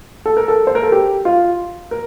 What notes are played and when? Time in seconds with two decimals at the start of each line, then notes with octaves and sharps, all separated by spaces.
0.26 A4
0.37 A#4
0.48 A4
0.67 C5
0.75 A#4
0.83 A4
0.92 G4
1.25 F4
1.91 A#4